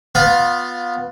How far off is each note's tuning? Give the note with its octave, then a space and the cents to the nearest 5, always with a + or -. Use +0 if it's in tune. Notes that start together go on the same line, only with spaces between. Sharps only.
B3 +0 F4 +20